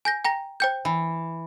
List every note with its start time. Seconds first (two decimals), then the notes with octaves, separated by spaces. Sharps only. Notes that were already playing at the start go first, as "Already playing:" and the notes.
0.05 G#5 G6 A#6
0.25 G5 A#5 A#6
0.60 C5 G5 G6
0.85 E3